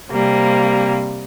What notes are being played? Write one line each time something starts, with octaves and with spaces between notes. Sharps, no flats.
C3 G3 A#3 C4